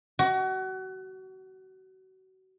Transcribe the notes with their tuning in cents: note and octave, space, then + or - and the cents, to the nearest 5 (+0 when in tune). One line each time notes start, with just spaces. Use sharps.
F#4 +30